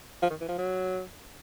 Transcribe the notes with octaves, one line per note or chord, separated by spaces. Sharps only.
F3
D#3
E3
F3
F#3